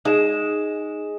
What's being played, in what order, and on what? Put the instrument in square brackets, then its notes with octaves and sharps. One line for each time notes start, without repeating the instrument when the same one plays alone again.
[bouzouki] G#3 [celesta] D#4 E7